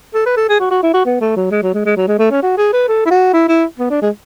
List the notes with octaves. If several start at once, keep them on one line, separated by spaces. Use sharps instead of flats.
A4
B4
A4
G#4
F#4
F#4
E4
F#4
B3
A3
F#3
G#3
F#3
G#3
G#3
F#3
G#3
A3
C#4
F#4
G#4
B4
A4
E4
F#4
E4
E4
B3
D4
G#3